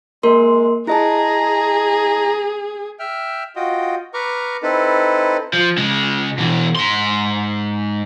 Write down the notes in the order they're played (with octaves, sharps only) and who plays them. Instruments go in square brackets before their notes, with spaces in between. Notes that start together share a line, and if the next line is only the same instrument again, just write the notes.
[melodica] G#3 [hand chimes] A#3 A#4 C6
[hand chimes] E4 D#5 A5 [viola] G#4 [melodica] A#5
[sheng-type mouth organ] E5 G5 F6
F4 F#4 D#5 G5
B4 A#5 C#6 D6 F6
C4 D#4 E4 A4 B4
[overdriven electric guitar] F3
C#3 G#3
B2 E3
G#2 C6